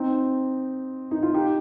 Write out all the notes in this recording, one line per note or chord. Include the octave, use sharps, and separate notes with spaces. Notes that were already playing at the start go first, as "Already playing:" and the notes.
Already playing: C4 D#4
D#4
F4
D#4 G4